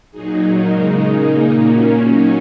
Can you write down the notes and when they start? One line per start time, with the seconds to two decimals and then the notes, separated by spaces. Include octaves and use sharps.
0.12 A#2 F#3 D#4 G#4
0.60 C#3 G#3 D#4 A#4
1.08 A#2 A#3 D#4 G#4
1.56 A#2 A#3 C#4 F#4
2.04 F#3 C#4 D#4